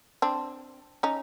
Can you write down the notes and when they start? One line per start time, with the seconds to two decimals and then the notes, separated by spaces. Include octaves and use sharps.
0.22 C4 D4
1.03 C#4 D#4